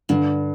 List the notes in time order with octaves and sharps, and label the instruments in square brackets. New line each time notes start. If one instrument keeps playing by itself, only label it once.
[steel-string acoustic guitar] G2 [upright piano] D3